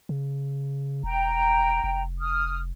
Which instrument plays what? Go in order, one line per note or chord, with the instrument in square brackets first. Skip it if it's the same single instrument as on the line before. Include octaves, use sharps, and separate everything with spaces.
[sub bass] C#3
[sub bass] E1 [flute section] G5 A#5
[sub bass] F1
[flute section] D#6 F6